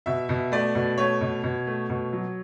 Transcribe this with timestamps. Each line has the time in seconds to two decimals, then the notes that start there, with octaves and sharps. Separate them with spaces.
0.06 B2 E5
0.29 B2
0.52 A3 D5
0.75 B2
0.98 A3 C#5
1.21 B2
1.44 B2
1.67 A3
1.90 B2
2.13 F#3